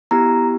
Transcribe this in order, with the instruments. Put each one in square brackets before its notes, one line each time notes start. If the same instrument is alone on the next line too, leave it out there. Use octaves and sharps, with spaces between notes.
[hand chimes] B3 E4 G4 A#5